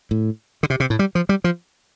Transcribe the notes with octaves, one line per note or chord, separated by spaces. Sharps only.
A2
D3
C3
C3
A2
G3
F3
G3
F3